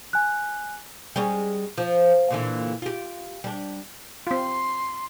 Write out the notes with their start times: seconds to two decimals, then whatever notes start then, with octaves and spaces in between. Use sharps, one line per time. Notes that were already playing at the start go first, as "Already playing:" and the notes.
0.13 G#5 F#6
1.16 G3 G#3 C#4
1.78 F3
2.30 A#2 D3 E3
2.82 F4 G4
3.44 G3 D4
4.27 C4 F4 C6